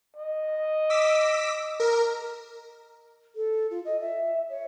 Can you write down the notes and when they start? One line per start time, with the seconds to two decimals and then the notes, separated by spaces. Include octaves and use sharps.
0.17 D#5
0.90 D6 E6 B6
1.80 A#4
3.36 A4
3.71 F4
3.85 D#5
4.00 E5
4.49 C#5